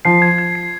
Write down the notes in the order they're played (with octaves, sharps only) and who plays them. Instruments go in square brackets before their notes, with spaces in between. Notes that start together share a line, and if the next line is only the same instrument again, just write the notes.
[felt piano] F3 [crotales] C7
[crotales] G#6
G#6
C7